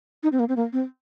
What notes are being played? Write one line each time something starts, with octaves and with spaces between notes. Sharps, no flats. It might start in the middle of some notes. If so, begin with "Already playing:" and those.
D#4
C4
A#3
C4
A#3
C4